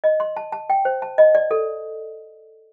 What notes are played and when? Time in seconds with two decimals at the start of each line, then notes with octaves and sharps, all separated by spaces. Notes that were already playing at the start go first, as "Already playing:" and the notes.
0.04 D#5
0.20 C6
0.37 A5
0.52 A5
0.70 G5
0.85 C5
1.02 A5
1.18 D#5
1.35 D5
1.51 A4